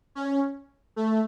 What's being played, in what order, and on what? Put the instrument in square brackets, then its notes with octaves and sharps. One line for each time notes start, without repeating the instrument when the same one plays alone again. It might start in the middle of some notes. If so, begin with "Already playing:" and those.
[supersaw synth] C#4
A3